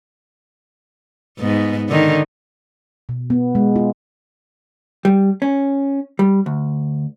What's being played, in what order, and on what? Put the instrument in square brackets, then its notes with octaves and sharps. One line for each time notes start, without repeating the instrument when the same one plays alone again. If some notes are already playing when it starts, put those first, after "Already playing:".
[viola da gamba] G#2 B3
D3 D#3
[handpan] B2
B3
G#3
F4
[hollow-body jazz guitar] G3
C#4
G3
D2